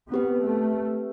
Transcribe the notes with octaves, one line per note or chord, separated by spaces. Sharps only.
B3 C4 G4 B4
A3